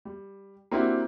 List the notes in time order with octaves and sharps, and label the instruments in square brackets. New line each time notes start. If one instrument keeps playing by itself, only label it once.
[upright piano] G3
A#3 C4 D4 E4 F#4 G4